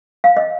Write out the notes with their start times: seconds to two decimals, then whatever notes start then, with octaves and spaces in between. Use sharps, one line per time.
0.24 F5
0.37 D#5